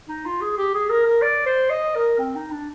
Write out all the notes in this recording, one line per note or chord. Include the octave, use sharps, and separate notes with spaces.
D#4
F4
G#4
G4
G#4
A#4
A#4
D5
C5
D#5
A#4
C4
D#4
D4